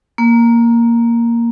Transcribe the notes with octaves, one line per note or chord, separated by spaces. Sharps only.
A#3